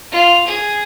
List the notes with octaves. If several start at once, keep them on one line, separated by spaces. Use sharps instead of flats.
F4
G#4